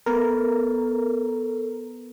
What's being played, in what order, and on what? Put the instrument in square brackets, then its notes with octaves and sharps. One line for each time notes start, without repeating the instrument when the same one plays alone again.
[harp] B3 [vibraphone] A4 [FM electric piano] A#4